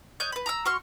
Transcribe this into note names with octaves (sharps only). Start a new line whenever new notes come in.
C#5 D#5 F#6 G6
B4 B5
A#5 D#6 E6
F#4 C6 C#6 F6